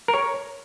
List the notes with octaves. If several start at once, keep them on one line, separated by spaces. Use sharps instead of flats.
A#4
C#5